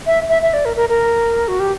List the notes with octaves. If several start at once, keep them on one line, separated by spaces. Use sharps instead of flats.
E5
E5
E5
D5
A#4
A#4
A#4
F#4
G4